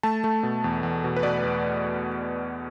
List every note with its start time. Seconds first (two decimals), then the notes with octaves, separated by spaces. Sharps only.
0.03 A3 A5
0.24 A3
0.43 B2
0.64 E2
0.83 E2
1.04 B2
1.16 B4
1.23 B2 D5
1.43 E2